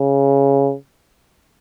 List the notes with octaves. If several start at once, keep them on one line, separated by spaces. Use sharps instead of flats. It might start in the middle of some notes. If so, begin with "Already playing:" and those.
Already playing: C#3